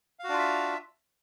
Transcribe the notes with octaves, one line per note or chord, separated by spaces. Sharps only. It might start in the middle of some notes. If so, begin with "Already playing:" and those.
D4 F4 F#4 E5 F5